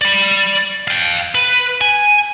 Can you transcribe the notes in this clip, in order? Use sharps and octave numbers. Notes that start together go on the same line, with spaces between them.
D5 B5
F5 G5
B4
G#5